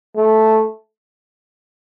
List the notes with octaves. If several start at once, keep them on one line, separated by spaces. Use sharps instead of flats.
A3